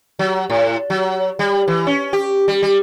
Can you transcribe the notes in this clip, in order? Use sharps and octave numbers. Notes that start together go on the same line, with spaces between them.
F#3
A2
F#3
G3
E3
C#4
G4
G3
G3